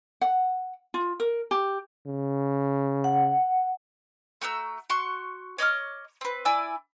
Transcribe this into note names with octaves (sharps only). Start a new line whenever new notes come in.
F#5
F4
A#4
G4
C#3
F#5
A3 F#4 A#5 E6
F#4 C6 C#6
C#5 D#5 D6 F6
C4 B4
E4 D5 G#5 E6